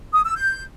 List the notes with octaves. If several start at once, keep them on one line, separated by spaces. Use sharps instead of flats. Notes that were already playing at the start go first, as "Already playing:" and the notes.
D#6
E6
G6